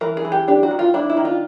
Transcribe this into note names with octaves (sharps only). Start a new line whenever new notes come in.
E3 A#4
G#4
E3
G4
D4 G4
F#4
D#3
F4
D4 E4
E4
D#3
F4